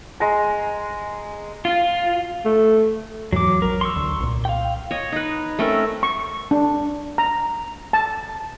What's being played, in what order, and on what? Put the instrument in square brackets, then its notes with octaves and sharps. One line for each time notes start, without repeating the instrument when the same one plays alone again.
[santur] G#3 A#5
[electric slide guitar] F4
[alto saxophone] A3
[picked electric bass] E2 G#2 E3 [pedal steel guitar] F#3 D6
[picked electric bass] A#1 F#3 [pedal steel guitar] A#4
[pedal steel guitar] C6 C#6 E6
[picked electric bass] D2
C2 A#2
[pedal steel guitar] F5 G5
[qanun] C#5 D#5
D#4 B4
A3 C4 C#4 A#4
[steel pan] C#6
D4
A#5
A5